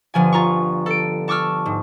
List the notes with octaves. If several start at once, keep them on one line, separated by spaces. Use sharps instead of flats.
G1 F3 G#5
F4 A#5 C#6
A4 D7
A5 C#6 D6 E6 F6
G#2